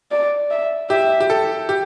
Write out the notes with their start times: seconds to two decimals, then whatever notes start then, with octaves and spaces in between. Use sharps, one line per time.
0.11 D5
0.51 E5
0.90 G4 E5
1.20 G4
1.30 A4
1.69 G4